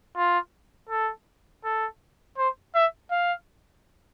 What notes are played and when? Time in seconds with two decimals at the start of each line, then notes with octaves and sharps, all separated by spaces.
0.16 F4
0.89 A4
1.64 A4
2.37 C5
2.75 E5
3.11 F5